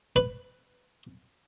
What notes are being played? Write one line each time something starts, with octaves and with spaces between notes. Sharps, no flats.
B4